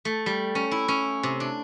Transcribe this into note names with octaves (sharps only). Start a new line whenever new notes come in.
A3
G3
C#4
E4
C#4
C3
D4